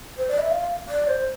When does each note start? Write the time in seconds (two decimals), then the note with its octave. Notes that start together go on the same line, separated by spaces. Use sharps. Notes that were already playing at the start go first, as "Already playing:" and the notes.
0.17 C5
0.28 D5
0.39 E5
0.51 F5
0.89 D5
1.07 C5